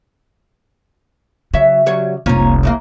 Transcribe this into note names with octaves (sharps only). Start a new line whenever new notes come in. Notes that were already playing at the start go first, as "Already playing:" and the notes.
C#3 F#3 E5
F#3 G3 C#5
F1 C2 A#3 C#4 F4
C#3 E3 A#3